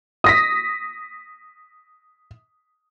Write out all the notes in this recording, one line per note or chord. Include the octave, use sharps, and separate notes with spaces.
D#6 A#6 B6